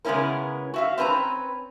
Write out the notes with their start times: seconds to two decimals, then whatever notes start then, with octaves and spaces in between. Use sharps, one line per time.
0.05 C#3 G#3 B3 C#4 E4 A#4
0.74 F#4 E5 F5
0.98 C4 C#4 B4 A5 A#5